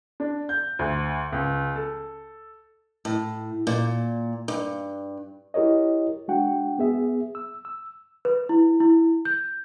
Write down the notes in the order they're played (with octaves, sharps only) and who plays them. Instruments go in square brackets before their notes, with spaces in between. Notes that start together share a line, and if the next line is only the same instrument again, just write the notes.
[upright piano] D4
G6
D2
C#2
A4
[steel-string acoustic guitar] A2
A#2
G2
[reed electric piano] E4 G4 A#4 C#5 D#5
G#3 D4 F#4 F#5 G5
B3 G#4 E5
E6
E6
[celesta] B4
E4
E4
G6